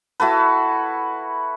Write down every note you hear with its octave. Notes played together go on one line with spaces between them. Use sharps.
E4 F#4 A4 B4